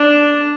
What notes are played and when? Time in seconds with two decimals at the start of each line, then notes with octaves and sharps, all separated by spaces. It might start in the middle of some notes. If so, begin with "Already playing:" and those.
Already playing: D4